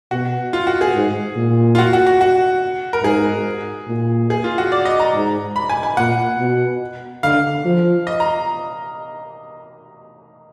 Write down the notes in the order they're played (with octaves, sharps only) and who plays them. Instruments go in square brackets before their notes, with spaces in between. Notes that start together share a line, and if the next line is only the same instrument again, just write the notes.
[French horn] B2 [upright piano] F#4
[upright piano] F4
F#4
G#4
[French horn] G#2
A#2
[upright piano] F4
F#4
F#4
F#4
F#4
A#4
[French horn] G#2 [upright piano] G#4
[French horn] A#2
[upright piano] G#4
F4
F#4
D5
D#5
A#5
[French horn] G#2
[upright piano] B5
G#5
G#5
[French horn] A#2 [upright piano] F#5
[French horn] B2
[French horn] D3 [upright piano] F5
[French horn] F3
[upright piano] D#5
A#5